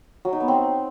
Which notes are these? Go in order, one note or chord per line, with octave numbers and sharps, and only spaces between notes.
F#3
D#4
B3
C4